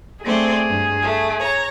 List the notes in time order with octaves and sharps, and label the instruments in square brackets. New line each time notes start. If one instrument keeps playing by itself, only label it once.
[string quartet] A3 C4 D5 [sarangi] G#4
[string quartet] G2
A3
C#5 A#5